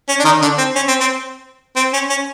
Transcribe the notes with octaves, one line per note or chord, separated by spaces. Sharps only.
C#4
D4
D#3 D#4
D3 D4
C4
C#4
C4
C4
C4
C#4
C#4